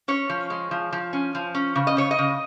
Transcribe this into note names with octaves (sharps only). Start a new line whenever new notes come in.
C#4 C#5
F3
G#3
F3
F3
C#4
F3
C#4
C#3
D#5
C#3 C#5
D#5
C#3